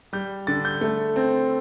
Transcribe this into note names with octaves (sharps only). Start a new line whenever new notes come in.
G3 G6
D3 A6
G6
A3
C4